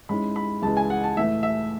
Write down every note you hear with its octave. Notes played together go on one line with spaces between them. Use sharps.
G#2 G#3 C#4 E4 B5
B5
C#2 C#3 E3 G#3 A5
G#5
F#5
A5
A2 E3 A3 E5
E5